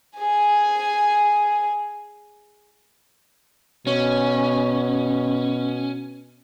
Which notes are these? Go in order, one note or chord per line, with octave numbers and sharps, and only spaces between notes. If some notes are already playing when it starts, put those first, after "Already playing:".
G#4 G#5
B2 C#4